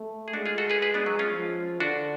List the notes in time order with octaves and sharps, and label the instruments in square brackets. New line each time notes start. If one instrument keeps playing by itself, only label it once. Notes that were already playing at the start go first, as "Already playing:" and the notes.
Already playing: [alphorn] A3
[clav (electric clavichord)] G#4
[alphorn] G#3 [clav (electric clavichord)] D4 F#4
[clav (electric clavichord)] F4 G#4
F#4 A4
G#4 B4
G#4 B4
B3 D4
F#3
C#4 F4
[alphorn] F3
[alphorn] D3 [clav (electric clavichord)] D4 F#4